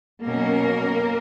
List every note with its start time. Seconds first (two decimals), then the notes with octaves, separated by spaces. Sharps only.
0.25 B2 F#3 A#3 C#4 A#4